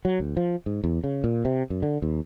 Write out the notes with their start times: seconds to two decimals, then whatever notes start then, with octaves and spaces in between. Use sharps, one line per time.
0.05 F#3
0.20 D2
0.37 F3
0.66 G#2
0.84 E2
1.04 C#3
1.24 A#2
1.45 C3
1.70 F#2
1.83 D3
2.02 D#2